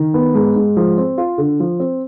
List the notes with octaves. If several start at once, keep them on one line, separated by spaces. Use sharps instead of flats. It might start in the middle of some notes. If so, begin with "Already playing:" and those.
Already playing: D#3
B3
G#2
G#2
F3
C4
F4
D3
F3
C4